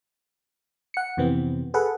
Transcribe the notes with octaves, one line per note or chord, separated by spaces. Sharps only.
F#5 C#7
F2 C3 E3 B3 C4
G#4 A4 B4 F#5